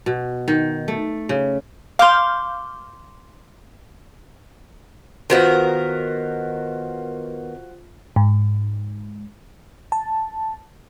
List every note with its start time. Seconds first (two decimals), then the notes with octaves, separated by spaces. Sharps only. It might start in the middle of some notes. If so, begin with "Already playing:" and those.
0.06 B2
0.48 D#3
0.88 A3
1.29 C#3
1.99 F5 C6 D6 F6 G6
5.30 D#3 B3 F4 F#4 A#4 C5
8.16 G#2
9.92 A5